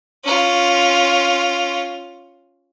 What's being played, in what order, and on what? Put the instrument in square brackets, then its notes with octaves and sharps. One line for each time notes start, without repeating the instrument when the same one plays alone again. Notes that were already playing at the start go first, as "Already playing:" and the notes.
[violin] C#4 F4